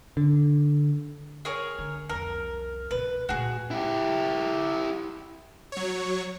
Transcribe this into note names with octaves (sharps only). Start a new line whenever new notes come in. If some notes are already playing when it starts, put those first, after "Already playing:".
D3
G#4 A#4 C#5
D3
C2 F2 A#4
C2 B2 B4
A#2 A3 F#4 G#4
E4 G4
F#3 C#5